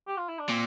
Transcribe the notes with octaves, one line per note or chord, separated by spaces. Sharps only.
G4
F4
E4
D4
A#2 C4